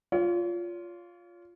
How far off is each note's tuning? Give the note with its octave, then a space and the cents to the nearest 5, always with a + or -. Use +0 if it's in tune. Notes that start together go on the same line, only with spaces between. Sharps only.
F4 +0 C#5 +40